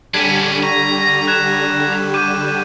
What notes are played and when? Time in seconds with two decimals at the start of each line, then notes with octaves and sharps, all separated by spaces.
0.14 D3 G3 C#4 D4 G#6 B6 D#7
0.63 A#5 C#6
1.27 F#6 G#6 E7
2.14 D6 G6 D#7